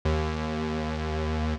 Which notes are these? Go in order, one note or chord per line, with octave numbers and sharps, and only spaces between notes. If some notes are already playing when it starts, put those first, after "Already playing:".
D#2